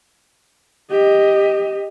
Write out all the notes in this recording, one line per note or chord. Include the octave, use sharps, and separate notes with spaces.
G4 D#5